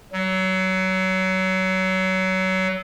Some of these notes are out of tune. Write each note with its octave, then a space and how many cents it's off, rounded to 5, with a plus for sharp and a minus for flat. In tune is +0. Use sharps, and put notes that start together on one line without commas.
F#3 +25